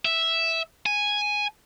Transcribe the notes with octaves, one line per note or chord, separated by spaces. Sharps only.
E5
G#5